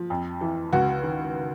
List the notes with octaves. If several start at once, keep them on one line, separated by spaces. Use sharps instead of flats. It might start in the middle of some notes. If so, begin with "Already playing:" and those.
Already playing: F3
F2
E3
C#2 F#4
D#3